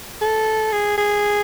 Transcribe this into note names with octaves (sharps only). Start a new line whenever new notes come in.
A4
G#4
G#4